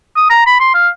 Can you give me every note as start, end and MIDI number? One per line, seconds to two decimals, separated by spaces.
0.16 0.26 87
0.29 0.41 82
0.46 0.56 83
0.60 0.72 84
0.74 0.88 77